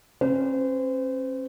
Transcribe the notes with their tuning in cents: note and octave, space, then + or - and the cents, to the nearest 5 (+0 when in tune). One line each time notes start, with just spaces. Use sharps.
C#4 -45 C5 -35